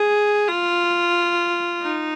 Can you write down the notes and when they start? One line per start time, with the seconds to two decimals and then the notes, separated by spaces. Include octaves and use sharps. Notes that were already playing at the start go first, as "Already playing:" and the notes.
Already playing: G#4
0.48 F4
1.82 D#4